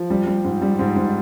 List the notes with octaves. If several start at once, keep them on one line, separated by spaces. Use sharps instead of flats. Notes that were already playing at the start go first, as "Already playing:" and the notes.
Already playing: F3
G3
G3
G#2
G3
G#2
G#2